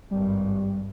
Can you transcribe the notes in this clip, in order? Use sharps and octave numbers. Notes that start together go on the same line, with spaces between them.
G#1 G2 G3